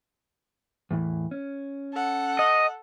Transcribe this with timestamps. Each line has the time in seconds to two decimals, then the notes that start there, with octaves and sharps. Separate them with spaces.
0.91 E2 A2 E3
1.31 C#4
1.93 A4 F#5
2.39 D#5